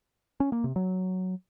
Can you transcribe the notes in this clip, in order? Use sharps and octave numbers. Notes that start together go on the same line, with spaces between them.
C#4
A#3
C3
F#3